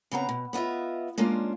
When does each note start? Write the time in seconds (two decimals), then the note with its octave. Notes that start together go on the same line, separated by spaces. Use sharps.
0.12 C#3 B3 C4 A#5
0.29 B2
0.53 B3 E4 F4 D#5 E5
1.18 G#3 A#3 C#4 D4 F4